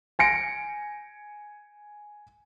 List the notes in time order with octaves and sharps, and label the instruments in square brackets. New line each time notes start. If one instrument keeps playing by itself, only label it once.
[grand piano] G#5 A#6 C#7 D7